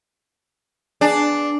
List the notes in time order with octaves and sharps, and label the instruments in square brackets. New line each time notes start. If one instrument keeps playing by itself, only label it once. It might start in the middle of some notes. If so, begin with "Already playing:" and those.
[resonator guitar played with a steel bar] B3 G#4 [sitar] D4